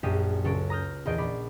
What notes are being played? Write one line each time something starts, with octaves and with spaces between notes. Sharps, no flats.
A#1 F#2 G4 G#4 D#6 D#7
C#2 F#3 A4 C#5 A6 D7
A#5 D#6 F6 G6
A#1 E2 A#4 D#5 G6 D7
A#1 D5 B5